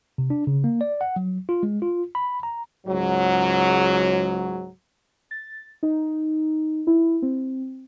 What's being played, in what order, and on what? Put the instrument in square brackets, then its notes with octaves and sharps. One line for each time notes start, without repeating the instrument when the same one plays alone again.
[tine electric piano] C3
D4
C#3
A#3
D5
F#5
F#3
F4
G#3
F4
B5
A#5
[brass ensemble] C#2 G#2 F#3
[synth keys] A6
D#4
E4
C4